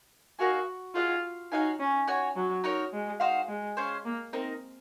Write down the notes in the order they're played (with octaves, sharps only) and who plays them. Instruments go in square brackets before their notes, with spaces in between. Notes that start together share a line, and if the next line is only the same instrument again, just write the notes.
[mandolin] D#4 A#4 F5 G#5 [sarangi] F#4
[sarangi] F4 [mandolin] G#4 D#5 F#5
[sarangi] D#4 [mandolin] F#4 C#5 F5 G#5
[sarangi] C#4
[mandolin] F#4 C#5 G#5
[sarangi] F#3
[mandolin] D#4 F#4 A#4 C#5
[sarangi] G#3
[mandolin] D#4 F#4 C5 F5
[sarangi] G#3
[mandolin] C#4 G#4 C5 F5
[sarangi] A#3
[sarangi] C4 [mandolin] D#4 A#4 D#5